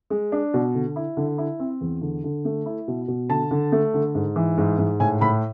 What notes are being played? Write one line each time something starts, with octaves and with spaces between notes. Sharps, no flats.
G#3
D4
B2
D3
E4
D3
E4
C4
E2
D3
D3
A3
E4
B2
B2
D3 A5
D3
A3
D3
G#2
E3
G#2
G#2
A2 G#5
A2 B5